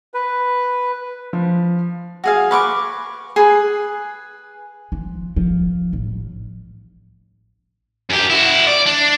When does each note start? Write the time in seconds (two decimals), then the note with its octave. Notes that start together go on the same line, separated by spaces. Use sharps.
0.14 B4
1.33 F3
2.24 F#4 G#4 F5
2.51 B4 C#6 D6
3.36 G#4 B4
4.92 F3
5.36 F3
5.93 A1
8.10 F#2 G4
8.30 E4 F#4
8.67 D5
8.86 D4